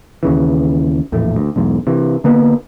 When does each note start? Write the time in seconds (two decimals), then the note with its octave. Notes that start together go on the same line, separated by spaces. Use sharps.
0.23 D#2 C#3 E3
1.12 A#1 E2 A2 A3
1.36 D2
1.56 B1 E2 G#2
1.87 C3 E3
2.24 D3 A#3 B3